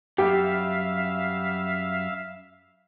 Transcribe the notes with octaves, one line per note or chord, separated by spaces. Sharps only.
F#2 G3 G4 E5 F5